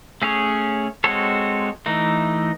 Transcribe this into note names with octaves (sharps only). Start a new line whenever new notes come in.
A3 C#4 G#4 C#5
G#3 C4 F#4 A4 C#5
E3 A3 D#4